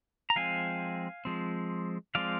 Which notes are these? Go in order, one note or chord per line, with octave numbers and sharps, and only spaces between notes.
A#5
F3 G#3 C4 F5 G#5
F3 G#3 C4
F3 G#3 C4 D5 F5